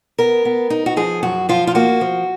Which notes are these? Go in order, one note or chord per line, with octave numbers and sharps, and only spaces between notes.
B3 A#4
B3
D#4
F#4
F3 G#4
F#2 F#4
F3 F4
F4
A#3 F#4
F3